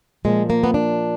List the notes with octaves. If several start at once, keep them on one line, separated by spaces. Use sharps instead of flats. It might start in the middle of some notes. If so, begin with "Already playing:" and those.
A#2 F3 G#3
A#3
B3
D4